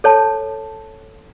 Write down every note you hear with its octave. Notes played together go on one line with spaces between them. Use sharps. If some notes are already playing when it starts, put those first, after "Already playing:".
A4 C#5 A5